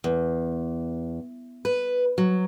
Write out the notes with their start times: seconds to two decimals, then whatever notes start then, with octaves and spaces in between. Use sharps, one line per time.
0.04 E2
1.65 B4
2.18 F#3